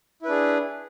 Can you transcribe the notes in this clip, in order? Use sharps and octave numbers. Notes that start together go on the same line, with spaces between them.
D4 E4 G#4 B4